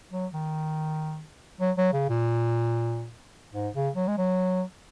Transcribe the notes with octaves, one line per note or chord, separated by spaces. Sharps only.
F#3
D#3
F#3
F#3
C#3
A#2
G#2
C#3
F#3
G#3
F#3